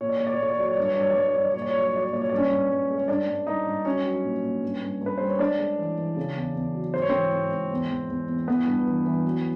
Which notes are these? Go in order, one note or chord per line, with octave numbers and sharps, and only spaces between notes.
A#2 C#5
D5
A#2 C#5
D5
C#5
A#2 D5
C#5
F#3 D5
C#5
G2 D5
C#5
G2 D5
C#5
D5
G2 C#5
D5
G2 C#5
D5
A#2 C#5
D5
C#5
F#3
D5
C#5
F#3 D5
C#5
A#2 D5
C#5
G2 D5
C#4 C#5
G2
G2
G#3
C#5
G2 D4 D5
G2
G2 D#4 D#5
G2
F#3 C#4 C#5
F#3
A#2
A#2
G2
G2
G2 B4
G3 C5
C#5
G#3 D4 D5
G#3
E3
E3
C#3
E2
E2
F#3
G#2 C5
C#5
E3 C4 C5
G#2
G#2
E2
E2
E2
E2
E3 B3 B4
G2
E3
E3
F#3